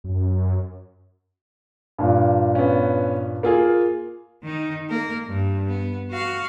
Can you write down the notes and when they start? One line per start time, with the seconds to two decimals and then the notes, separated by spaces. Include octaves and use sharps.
0.04 F#2
1.98 G2 A#2
2.55 B3 C#4
3.43 A#3 F4 G#4
4.43 D#3 D#4
4.90 A#3 A#4
5.26 G2
5.69 B3
6.10 F#4 F5